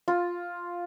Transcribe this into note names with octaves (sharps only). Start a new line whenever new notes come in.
F4